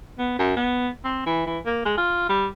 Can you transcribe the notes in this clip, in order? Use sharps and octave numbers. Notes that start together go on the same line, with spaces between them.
B3
F#2
B3
C4
E3
E3
A#3
G#3
F4
G3